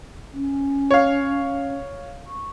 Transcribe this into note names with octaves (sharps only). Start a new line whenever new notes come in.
C#4
C#5 F5
C#6